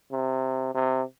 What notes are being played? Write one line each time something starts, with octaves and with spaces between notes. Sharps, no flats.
C3
C3